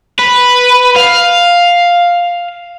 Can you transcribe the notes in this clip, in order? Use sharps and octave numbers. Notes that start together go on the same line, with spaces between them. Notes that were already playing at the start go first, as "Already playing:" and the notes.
B4
F5